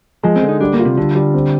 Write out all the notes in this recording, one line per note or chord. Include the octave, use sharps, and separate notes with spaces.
F3 G#3
C4
D3
D#4
G3 D4
A#3
F4
C3
D3 G3
G3
C4